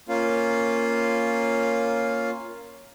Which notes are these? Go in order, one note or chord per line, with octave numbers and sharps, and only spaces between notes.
A#3 C#4 F4 F5